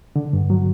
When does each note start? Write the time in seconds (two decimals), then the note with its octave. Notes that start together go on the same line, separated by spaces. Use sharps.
0.16 D3
0.33 G2
0.50 F#3